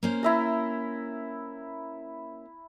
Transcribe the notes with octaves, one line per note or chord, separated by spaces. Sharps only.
A#3 C#4 C5
E4 E5 A#5